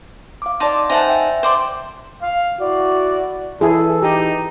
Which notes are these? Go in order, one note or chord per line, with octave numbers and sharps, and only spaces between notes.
F5 D6
D#4 D5 A5 C6 D6
D#4 C5 E5 F#5 G#5 A5
E5 G5
C5 D5 C6
F5
E4 F#4 D5
E3 E4 G#4 A4
D#4 G4